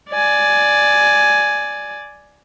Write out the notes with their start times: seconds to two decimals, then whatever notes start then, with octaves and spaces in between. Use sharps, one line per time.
0.10 D5 G#5